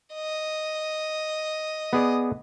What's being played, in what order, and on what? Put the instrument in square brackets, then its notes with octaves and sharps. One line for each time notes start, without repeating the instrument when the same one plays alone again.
[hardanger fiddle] D#5
[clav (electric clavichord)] B3 G#4 D5